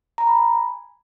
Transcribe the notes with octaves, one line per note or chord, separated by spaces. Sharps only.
A#5
B5
G#5